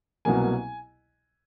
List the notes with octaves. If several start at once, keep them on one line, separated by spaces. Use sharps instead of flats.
C2 B2 F#3 A#3 G#5